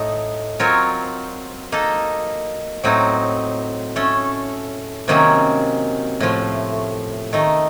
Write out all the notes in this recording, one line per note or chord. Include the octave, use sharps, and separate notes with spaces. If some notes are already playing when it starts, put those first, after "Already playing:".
Already playing: A2 A3 D#4 A4 D#5
F#3 C4 F4 A#4 C#5
A#3 D#4 A4
A2 F#3 C4 D#4
A3 C#4 A4
C3 D#3 F#3 A#3 C#4
A2 F3 A3
D#3 A3 D#4